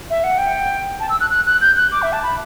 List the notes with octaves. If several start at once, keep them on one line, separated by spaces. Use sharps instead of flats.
E5
F#5
G5
A5
E6
F#6
F#6
F#6
G6
F#6
D6
E5
A5
B5